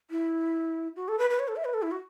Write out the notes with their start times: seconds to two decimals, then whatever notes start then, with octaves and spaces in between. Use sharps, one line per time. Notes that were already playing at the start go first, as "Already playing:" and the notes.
0.10 E4
0.96 F#4
1.08 A4
1.18 B4
1.30 B4
1.39 C#5
1.48 A4
1.56 E5
1.65 B4
1.74 A4
1.82 E4
1.91 F#4